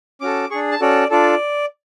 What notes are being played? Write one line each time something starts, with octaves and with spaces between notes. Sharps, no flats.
C#4 F#4 A4 D6
D4 G#4 C#6
A5
C#4 F#4 A4 D5
D4 F4 A4 D5